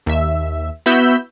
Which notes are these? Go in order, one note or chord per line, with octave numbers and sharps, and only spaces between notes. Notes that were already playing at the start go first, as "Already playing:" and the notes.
D#2 E5
B3 E4 F#4 B5 E6 G6